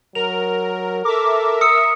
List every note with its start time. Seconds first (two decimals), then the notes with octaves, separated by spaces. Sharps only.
0.15 F#3 A#4 F7
1.05 A4 A#4 E5 D6
1.61 D#6 E6 C#7